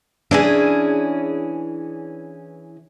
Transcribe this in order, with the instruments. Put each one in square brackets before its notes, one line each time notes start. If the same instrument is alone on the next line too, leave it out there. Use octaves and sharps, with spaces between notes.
[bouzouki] E3 C#4 G#4 [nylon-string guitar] D4